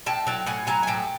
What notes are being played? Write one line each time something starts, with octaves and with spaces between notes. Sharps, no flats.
A2 G5 A5
F#3 G5 A5
A2 F#5 G#5
F#3 G#5 A#5
G#5
A2 G5 A5